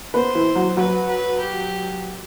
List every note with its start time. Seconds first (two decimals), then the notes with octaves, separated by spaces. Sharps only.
0.14 B3 B4 C5
0.35 E3 E4
0.55 F#3 F#4
0.77 F#3 F#4 B4
1.08 B4
1.40 G4